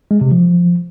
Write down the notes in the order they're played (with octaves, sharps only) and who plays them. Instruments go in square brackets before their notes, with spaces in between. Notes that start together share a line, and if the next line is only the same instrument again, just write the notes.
[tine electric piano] G#3
C3
F3